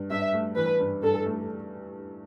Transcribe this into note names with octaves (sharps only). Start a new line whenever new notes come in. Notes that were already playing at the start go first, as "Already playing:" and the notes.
Already playing: G2
G2 E5
A3
E3 B4
G2
G2 A4
A3